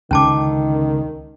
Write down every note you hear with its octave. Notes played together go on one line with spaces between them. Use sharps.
C#2 D3 D#3 C#4 A5 D6